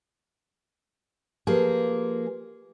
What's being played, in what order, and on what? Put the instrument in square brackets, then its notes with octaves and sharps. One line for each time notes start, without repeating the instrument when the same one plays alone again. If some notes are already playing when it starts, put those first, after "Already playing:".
[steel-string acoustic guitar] F3 A#3 G#4 [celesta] G4 B4